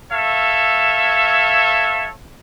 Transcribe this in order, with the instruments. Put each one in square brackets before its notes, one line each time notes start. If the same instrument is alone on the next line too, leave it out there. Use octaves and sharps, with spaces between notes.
[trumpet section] A4 C#5 E5 F5